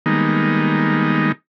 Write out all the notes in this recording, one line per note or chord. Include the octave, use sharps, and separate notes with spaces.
D#3 G3 G#3 A#3 B3 D#4